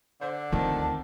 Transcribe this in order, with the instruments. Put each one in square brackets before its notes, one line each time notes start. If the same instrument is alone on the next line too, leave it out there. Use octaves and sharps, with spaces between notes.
[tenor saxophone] D3 [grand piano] C5
[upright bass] D2 F4 [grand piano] D#3 C4 [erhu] A5